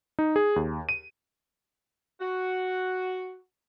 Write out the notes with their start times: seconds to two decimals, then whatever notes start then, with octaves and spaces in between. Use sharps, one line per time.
0.19 D#4
0.36 G#4
0.56 D#2
0.89 D#7
2.20 F#4